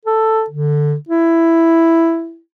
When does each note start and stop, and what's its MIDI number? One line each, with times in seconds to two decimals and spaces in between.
0.05 0.45 69
0.50 0.94 50
1.09 2.40 64